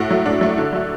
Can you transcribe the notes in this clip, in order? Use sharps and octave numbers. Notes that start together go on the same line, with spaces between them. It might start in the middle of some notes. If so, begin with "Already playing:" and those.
Already playing: A2 F#4
F#3 A3
A2 D4
F#3 A3
D3
F#3 A3